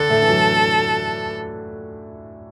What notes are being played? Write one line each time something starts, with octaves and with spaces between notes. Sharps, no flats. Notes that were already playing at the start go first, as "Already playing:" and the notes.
Already playing: D3 D4 A4
A2 A3
E3
F#3